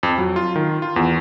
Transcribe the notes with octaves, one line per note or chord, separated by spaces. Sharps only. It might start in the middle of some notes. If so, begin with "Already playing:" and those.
F2
F#3
F4
D#3
F4
E2